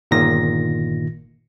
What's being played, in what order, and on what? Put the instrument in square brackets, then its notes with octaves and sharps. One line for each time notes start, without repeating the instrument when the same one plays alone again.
[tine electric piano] G1 A#2 D#3 A#6